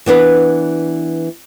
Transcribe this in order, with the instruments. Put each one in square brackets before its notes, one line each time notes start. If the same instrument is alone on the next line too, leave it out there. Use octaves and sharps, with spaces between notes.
[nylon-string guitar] E3 B3 D4 B4